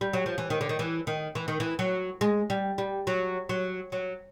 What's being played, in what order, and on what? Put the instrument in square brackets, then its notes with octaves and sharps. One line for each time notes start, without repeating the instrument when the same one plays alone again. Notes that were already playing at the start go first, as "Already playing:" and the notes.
[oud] G3
F#3
F3
E3
D#3
D3
D#3
E3
D#3
E3
D#3
E3
F#3
G#3
G3
G3
F#3
F#3
F#3